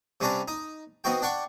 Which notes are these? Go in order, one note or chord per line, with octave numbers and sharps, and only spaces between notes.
C3 G3 C#4 D4 B4 A#5
D#4
B3 C4 D#4 F#4 G5
D4 F#5 G5 C#6